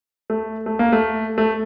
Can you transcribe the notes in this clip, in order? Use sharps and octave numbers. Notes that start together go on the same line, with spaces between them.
A3
A3
A#3
A3
A3